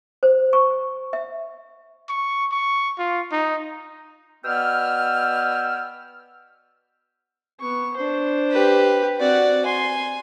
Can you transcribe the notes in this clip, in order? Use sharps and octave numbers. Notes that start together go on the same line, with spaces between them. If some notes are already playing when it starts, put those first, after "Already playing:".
C5
C#6
E5
C#6
C#6
F4
D#4
B2 B3 D5 G5 E6 F6
B3 C#6
D4 C5
G4 B4
C4 F#4 D5 F#5
G#5 C6